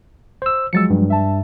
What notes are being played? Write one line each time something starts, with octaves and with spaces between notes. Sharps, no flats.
C5 E6
F3 F#3 G#3 E6 A6 C#7
G2
E5 A5